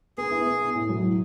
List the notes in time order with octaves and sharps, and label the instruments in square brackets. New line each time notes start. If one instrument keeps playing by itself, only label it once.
[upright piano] B3 [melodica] G#4
[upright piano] E4
B3
E4
A2
F#3
A2